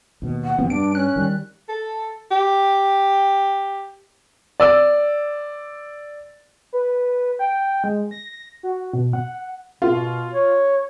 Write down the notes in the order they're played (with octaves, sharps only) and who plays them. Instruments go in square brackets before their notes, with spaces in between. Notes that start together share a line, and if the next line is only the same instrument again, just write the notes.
[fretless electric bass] D#2 B2
[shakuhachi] F#5
[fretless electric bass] F2 C3 E3 [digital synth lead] B3
[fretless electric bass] G2 [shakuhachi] D4 [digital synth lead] D7
[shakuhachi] C#4 [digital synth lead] F#6
[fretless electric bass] D#3 G3
[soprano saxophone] A4
G4
[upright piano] D5 E6
[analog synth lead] B4
G5
G#3
A#6
F#4
B2
F#5
[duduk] B2 [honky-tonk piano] F4
[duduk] C#5